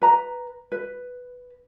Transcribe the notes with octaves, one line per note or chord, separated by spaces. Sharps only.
B4 A#5
B4